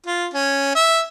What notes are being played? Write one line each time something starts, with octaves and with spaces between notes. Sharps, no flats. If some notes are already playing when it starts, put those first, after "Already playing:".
F4
C#4
E5